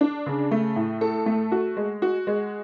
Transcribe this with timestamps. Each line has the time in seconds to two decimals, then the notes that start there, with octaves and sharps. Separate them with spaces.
0.01 D4
0.26 C#3
0.51 A3
0.76 A2
1.01 A4
1.26 A3
1.52 F#4
1.77 G#3
2.02 F#4
2.27 G#3